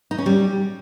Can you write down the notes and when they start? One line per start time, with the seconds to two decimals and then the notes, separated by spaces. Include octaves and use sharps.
0.11 D#4
0.18 C#4
0.26 G3